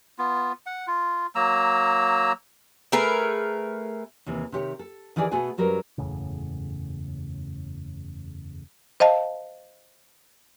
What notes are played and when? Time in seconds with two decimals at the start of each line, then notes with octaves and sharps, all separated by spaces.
0.19 B3 F4
0.66 F#5
0.88 F4
1.35 F#3 A#3 A#5 E6
2.92 A3 G#4 A#4 B4
4.26 D#2 C3 E3
4.52 C3 D#3 G4 C#5
4.79 A4
5.16 D#3 E3 G4 G#4 D5
5.31 B2 A3 B3 F#4 G#4 G#5
5.57 F#2 F#3 G3 A#4 B4
5.98 F#1 E2 A2 C#3
9.00 C5 D#5 F5 A5